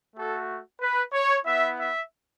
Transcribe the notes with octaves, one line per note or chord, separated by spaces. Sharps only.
A3 F#4 A4
B4
C#5
B3 E4 E5
E5